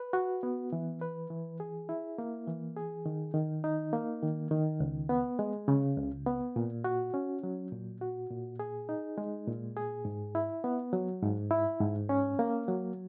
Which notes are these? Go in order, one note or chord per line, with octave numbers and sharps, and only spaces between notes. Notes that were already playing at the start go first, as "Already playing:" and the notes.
Already playing: B4
F#4
B3
E3
B4
E3
G#4
E4
A#3
E3
G#4
D#3
D#3
D#4
A#3
D#3
D#3
C#2
B3
G#3
C#3
C#2
B3
A#2
F#4
C#4
F#3
A#2
F#4
A#2
G#4
D#4
G#3
A#2
G#4
G#2
E4
B3
F#3
G#2
E4
G#2
C#4
A#3
F#3